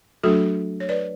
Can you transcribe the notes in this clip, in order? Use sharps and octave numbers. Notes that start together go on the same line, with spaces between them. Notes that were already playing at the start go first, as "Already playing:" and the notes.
F#3 A3 D4 F#4 A4
C#5
B4 D5